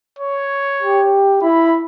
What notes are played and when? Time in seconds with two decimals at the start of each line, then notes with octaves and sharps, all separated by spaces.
0.19 C#5
0.82 G4
1.42 E4 B5